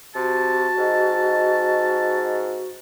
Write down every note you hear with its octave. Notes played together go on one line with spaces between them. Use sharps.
C3 F#4 A5
G#2 D#5